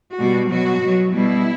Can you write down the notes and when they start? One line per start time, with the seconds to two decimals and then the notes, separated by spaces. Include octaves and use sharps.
0.17 B2 G3 F#4
0.49 B2 F#3 F#4
0.81 B2 F#3
1.12 B2 G3 E4